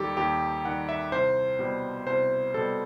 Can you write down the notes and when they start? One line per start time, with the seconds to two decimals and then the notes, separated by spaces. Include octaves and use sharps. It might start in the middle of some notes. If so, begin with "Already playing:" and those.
Already playing: D#2 D#3 G3 G4 A4
0.17 D#2 G4
0.65 D#3 G3 F#5
0.89 E5
1.12 C2 C5
1.59 B2 G3
2.07 C2 C5
2.54 B2 G3 A4